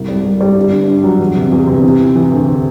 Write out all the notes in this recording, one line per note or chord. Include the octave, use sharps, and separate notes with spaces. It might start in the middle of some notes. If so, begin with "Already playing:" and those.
Already playing: C2
G3
G3
G3
G1
G2
G2
F#3
E2
C3
E2
C3
E3
E3
E3
D2